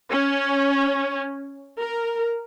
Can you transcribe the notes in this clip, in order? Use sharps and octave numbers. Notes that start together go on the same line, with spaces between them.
C#4
A#4